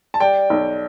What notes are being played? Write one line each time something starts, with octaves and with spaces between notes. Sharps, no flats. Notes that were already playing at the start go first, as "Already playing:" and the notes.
A5
G3 D5 G5
B1